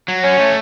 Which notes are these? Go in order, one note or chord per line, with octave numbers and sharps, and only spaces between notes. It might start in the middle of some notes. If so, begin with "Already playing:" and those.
F#3
C#4 C#5
A3